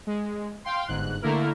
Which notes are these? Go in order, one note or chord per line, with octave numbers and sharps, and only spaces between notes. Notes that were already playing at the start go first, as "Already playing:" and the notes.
G#3
F5 G5 C6
G1 G#2 F#6
D3 A3 A#3 E4 A#4